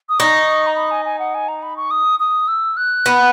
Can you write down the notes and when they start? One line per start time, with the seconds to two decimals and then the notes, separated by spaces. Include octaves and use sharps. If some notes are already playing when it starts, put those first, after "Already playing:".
0.09 D#6
0.19 D#4 C#6
0.67 A#5
0.77 B5
0.91 G#5
1.05 G#5
1.19 F#5
1.34 G#5
1.48 A#5
1.63 B5
1.77 C#6
1.91 D#6
2.20 D#6
2.48 E6
2.77 F#6
3.06 B3